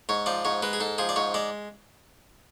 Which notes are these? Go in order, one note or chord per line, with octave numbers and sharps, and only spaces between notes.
G#2 C#5
F3 D5
G#2 C#5
G#3 B4
G#4
G#2 A4
F3 G#4
D5
G#2 C#5
G#3 D5